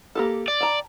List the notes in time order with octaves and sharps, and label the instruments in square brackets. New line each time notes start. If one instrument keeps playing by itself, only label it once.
[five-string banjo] A#3 G4 A4
[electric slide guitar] D5
[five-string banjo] G5 A5 A#5